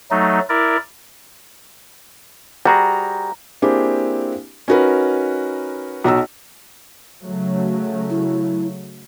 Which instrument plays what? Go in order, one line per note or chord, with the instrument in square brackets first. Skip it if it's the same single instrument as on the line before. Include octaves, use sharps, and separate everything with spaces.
[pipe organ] F#3 A3 D#4
E4 A#4 D5
[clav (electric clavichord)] G3 F#4 G#4 [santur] A#5
[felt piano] A#3 C4 D4 E4 G4 G#4
C#4 D#4 F#4 A#4 B4
B1 F#4 A#5 E6
[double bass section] C#3 F#3 A3
[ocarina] E4